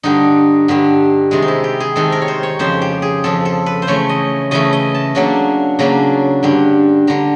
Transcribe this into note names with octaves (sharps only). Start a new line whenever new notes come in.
G2 D3 G3 D#4
G2 D3 G3
C3 D#3 G#3
D#4
E4
G4
G#4
C3 D#3 G#3 A4
A#4
C#5
C5
C#5
F2 C#3 F3 C5
G4
G#4
F2 C#3 F3 A4
A4
B4
C5
C#3 E3 A3 C#4 C#5
D#5
C#3 E3 A3 C#4 D#5
D#5
A5
C#3 F#3 A#3 D4
C#3 F#3 A#3 D4 A#5
G2 D3 G3
D3 G3 A#5